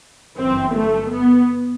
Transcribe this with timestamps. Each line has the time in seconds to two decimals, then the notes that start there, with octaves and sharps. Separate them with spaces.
0.37 G1 F#2 E3 C4
0.76 A3
1.15 B3